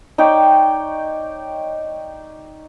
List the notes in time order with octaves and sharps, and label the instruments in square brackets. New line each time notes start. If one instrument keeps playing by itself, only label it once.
[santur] D#4 C#5 D5 G5